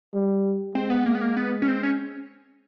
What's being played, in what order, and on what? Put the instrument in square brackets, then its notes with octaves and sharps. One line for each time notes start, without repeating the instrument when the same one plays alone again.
[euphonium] G3
[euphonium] G#3 [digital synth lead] C4
[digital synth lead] B3
A#3
B3
A#3
B3
C#4
C4
C#4